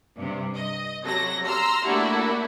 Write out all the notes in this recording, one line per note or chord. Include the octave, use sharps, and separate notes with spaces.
G2 C3
D#5
C3 F#3 A4 A#6
A#5 C6 E6 F6
A3 A#3 D4 E4 F#4 G4